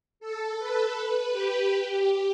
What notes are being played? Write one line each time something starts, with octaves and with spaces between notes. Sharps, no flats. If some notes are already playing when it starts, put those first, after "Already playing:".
A4
B4
G4
G4